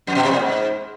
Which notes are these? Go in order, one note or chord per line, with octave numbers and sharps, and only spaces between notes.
F2
B2
C3
A#2
G#2